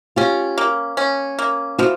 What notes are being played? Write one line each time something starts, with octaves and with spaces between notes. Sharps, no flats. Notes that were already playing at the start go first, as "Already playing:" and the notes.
C#4 F4 G4
A#3
C#4
A#3
F3 E4 F#4